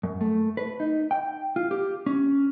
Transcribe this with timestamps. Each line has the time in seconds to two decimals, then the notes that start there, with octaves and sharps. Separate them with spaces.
0.03 F#2
0.21 A3
0.57 B4
0.80 D#4
1.11 G5
1.56 F4
1.71 G4
2.06 C#4